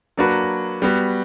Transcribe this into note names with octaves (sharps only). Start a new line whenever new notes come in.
F#3 A#3 D4 F#4 B4
G3 B3 F#4